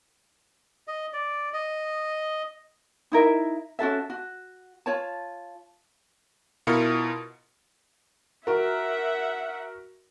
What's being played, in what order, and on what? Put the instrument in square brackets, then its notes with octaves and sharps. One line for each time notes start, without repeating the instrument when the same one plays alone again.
[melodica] D#5
D5
D#5
[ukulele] D#4 E4 A#4 E5
C#4 F#4 A4 E5
F#4
F4 C#5 A5
[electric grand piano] B2 E4 F4 A#4 C#7
[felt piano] F#4 A#4 [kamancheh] E5 F#5